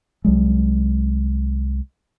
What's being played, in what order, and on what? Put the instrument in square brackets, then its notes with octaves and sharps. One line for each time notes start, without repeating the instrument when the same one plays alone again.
[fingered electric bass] C2 F#3 G#3